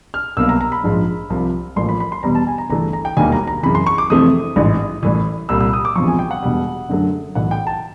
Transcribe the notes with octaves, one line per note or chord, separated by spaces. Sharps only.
F6
C2 B2 F#3 A#3 E6
A#5
A#5
B5
A#1 G#2 F3 G#3
C2 C3 F3
A1 A2 F3 A#3 C6
B5
B5
C6
E2 B2 G3 B3 A#5
A5
G#5
A#5
G1 G2 E3 A3 A#5
A#5
G5
E1 D#2 D#3 G3 A#3 G#5
A#5
A#5
F#2 C#3 E3 B5
C6
C#6
D6
F2 C3 E3 A3 C4 D#6
A1 G#2 E3
A1 A2 E3
C2 A#2 G3 E6
E6
D#6
D6
E1 E2 C3 F3 C#6
G#5
G5
F#5
E1 E2 B2 G3
F#2 D3 F#3 A3
B1 A2 E3 F#5
G5
A5